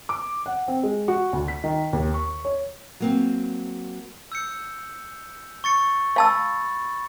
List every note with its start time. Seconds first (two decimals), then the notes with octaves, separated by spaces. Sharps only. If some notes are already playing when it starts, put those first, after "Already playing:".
0.09 D6
0.46 F#5
0.68 C4
0.83 G#3
1.08 F#4
1.33 D2
1.48 B6
1.64 D#3
1.93 D#2
2.14 C#6
2.45 C#5
3.00 F#3 A#3 C4
4.32 E6 G6 C#7
5.64 C#6 A6 C#7
6.16 F5 A5 B5 E6 A6